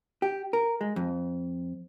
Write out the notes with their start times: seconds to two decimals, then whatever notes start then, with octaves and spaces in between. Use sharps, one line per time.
0.22 G4
0.53 A#4
0.81 G#3
0.96 F2